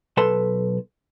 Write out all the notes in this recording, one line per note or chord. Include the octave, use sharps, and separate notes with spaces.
B1 A4 B4 A5 C6